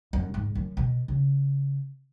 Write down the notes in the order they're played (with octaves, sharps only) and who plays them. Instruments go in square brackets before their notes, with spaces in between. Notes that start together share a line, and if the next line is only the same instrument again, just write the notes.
[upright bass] F#2
G#2
F#2
B2
C#3